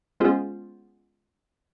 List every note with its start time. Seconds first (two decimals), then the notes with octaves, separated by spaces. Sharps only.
0.20 G#3 B3 C#4 F4 G#4 C5